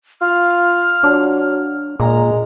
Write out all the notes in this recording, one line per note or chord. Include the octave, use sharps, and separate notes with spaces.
F4 F6
F#3 D4
A#2 G#3 A#5